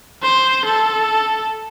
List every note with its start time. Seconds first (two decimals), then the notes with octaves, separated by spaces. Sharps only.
0.23 C5
0.65 A4